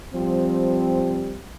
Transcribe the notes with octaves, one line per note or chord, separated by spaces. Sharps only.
F3 G3 C4